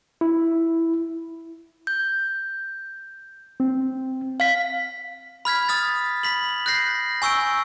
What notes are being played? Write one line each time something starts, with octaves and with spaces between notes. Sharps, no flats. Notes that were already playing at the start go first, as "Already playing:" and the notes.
E4
G6
C4
F5 B6
B5 F6 G#6 B6
D#6 F6 A6
B5 B6 F#7
F#6 G6 A#6 C7
G#5 C#6 E6 G6 D7